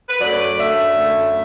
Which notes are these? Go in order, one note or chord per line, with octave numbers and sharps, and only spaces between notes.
B4
F#2 F#3 A3 D5
F#2 D3 A3 E5
F#2 D3 A3